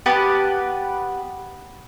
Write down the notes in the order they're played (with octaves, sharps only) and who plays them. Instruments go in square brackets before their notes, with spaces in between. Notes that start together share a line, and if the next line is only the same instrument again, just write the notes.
[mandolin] B3 G4 B4 A5